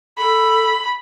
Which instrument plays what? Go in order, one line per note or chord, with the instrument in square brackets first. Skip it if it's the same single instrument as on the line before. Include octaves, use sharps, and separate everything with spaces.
[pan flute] A4 [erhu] B5